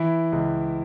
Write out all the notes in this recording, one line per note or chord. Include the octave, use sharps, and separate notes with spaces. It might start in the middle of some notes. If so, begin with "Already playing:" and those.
Already playing: E3 E4
C#2